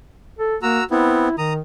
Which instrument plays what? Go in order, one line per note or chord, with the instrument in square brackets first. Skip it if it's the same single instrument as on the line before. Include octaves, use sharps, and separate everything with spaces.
[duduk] A4
[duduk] A#3 [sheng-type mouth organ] F#4 A#5 E6
[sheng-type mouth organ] B3 C4 [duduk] E4
[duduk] D#3 [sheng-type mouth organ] A#5 D#6